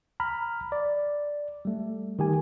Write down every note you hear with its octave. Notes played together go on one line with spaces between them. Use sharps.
A#5 B5 F6
D5
G3 A3
D#3 G4 G#5